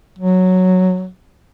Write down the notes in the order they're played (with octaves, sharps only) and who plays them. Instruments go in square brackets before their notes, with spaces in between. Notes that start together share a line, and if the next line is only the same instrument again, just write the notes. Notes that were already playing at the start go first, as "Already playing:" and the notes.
[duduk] F#3